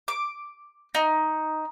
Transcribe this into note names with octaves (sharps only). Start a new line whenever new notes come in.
D6
D#4